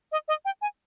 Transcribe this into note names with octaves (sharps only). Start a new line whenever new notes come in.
D#5
D#5
G5
G#5